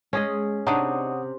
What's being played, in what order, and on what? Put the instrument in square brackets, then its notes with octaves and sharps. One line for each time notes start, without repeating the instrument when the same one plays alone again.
[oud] G#3 [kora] C#4 G#4 D#5
[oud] C3 [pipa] G#3 D4 D#4 [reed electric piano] C#5 F#5 D#6